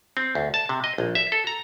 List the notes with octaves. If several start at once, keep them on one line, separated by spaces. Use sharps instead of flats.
C4
D2
A5
C3
D#5
A#1
E5
A4
A#5